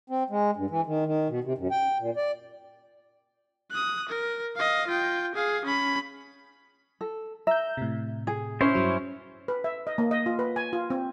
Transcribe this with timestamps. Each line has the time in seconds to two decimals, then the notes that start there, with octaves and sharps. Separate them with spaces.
0.10 C4
0.30 G#3
0.56 G2
0.70 E3
0.86 D#3
1.06 D#3
1.29 B2
1.44 C3
1.58 F#2
1.71 G5
2.00 A#2
2.16 D5
3.71 D#6 F#6
4.09 A#4
4.56 D#5 F5
4.88 F4 G5
5.35 G#4 F5
5.65 C#4 B5
7.01 A4
7.47 E5 A#5 G6
7.77 A2 C3
8.27 G#4
8.61 C#4 E4 C5 C#5
8.75 G2 F#3
9.48 B4
9.64 E5
9.87 D#5
9.98 A#3
10.11 D#5
10.26 F4
10.39 B4
10.56 G#5
10.73 F4
10.90 C4